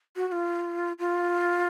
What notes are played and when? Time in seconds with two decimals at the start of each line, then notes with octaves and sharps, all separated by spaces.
0.16 F#4
0.27 F#4
0.32 F4
0.99 F4